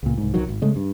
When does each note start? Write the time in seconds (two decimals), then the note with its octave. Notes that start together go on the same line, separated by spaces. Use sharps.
0.03 C#2 A#2
0.18 C2 G#2
0.34 B1 D#3 F#3
0.49 G#1
0.62 C#3 G#3 A3
0.76 G2